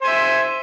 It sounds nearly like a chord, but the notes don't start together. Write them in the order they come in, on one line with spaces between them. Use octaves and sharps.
C5 G#5 E5